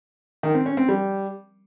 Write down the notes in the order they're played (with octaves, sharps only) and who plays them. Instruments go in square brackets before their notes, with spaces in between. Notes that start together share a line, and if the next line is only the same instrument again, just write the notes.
[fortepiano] D#3
C4
C#4
C4
G3